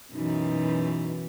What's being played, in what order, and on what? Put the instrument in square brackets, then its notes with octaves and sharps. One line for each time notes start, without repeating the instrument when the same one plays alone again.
[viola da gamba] F#2 B2 E3 [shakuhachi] D#4